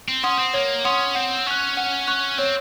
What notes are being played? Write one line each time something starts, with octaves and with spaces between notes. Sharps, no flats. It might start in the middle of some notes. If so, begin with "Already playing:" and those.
C4
C#4 F#5 C6 D#6
C4
A#3 C#5
C#4 F#5 C6 D#6
C4 F#5
C#4 C#6 F#6
F#5
C#6 F#6
C4 C#5